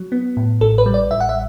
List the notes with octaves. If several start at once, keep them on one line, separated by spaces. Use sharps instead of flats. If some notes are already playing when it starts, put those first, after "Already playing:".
Already playing: F#3
B3
A2
A1 A4
B4
G3
D5
A1 E5
F#5
E5